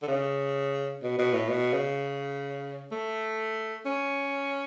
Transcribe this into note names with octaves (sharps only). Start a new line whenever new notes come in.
D3
C#3
B2
B2
A2
B2
C#3
A3
C#4